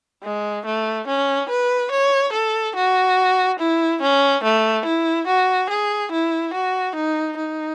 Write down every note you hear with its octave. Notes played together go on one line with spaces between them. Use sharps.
G#3
A3
C#4
B4
C#5
A4
F#4
E4
C#4
A3
E4
F#4
G#4
E4
F#4
D#4
D#4